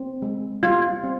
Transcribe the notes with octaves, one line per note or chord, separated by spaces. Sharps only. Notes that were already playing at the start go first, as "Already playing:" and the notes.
Already playing: C4
G#3
G3 F4
C4